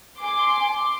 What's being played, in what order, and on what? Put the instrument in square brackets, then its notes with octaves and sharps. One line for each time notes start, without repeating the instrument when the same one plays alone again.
[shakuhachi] G#5 [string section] C6 D6